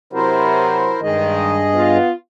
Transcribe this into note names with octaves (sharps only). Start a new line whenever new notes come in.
C3 F#3 E4 A#4 C5
G2 D#3 G#3 G#4 D#5
B3 F4